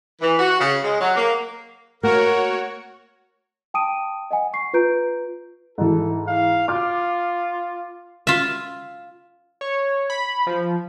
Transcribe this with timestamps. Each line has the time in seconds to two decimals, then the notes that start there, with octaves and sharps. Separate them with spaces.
0.22 E3
0.39 F#4
0.59 C#3
0.83 G#3
1.00 F#3
1.16 A#3
2.03 A#3 F#4 A#4 C#5
3.74 G5 A5 D#6 D7 D#7
4.31 D#5 F#5 G#5
4.53 C#6 C7
4.73 F4 B4 A#5 G6 D7
5.78 G#2 E3 A4
6.27 F5
6.68 F4 D6 F6
8.27 F4 E5
9.61 C#5
10.10 B5
10.47 F3